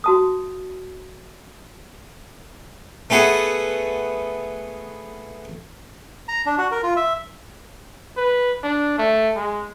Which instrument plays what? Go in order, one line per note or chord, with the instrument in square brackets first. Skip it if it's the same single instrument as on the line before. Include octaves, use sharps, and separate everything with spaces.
[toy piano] F#4 A5 D#6
[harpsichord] A3 B3 G#4 F#5
[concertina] A#5
D4
F#4
A#4
F4
E5
[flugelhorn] B4
D4
A3
G#3